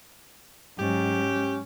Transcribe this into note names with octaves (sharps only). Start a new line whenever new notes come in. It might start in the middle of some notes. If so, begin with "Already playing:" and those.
G#2 F#3 C#4 G4